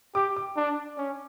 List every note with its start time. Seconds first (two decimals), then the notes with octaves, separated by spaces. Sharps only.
0.15 G4 D6
0.36 D6
0.57 D4
0.98 C#4